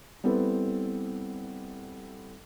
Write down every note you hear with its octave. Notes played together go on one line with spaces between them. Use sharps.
G3 B3 C4 E4 A4 B4